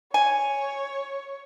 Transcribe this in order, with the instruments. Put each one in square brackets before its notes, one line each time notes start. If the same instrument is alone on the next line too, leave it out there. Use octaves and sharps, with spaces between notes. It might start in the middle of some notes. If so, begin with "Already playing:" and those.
[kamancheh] C#5 [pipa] G#5